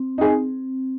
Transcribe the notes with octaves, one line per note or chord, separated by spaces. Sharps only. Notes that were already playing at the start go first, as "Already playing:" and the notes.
Already playing: C4
D#4 G#4